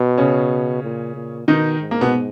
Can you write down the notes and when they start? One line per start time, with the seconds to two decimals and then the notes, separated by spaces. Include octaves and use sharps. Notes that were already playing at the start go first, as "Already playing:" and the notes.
Already playing: B2
0.18 C#3 C#4
0.83 A#2
1.15 A#2
1.48 B2 D#3 D#4
1.80 G#2
1.91 A#3
2.01 B2 B3